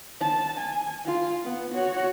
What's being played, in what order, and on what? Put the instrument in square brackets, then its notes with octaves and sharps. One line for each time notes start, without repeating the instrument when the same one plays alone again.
[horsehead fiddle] A5
G#5
F4
B3
F#4 C#5